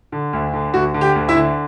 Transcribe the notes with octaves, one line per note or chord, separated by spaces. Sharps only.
D3
D2
D3
D2 F#4
D3
G4
D2
E4 E5
D3